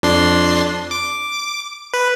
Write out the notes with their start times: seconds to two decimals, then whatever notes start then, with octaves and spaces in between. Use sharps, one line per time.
0.03 F2 D4 C6
0.91 D6
1.94 B4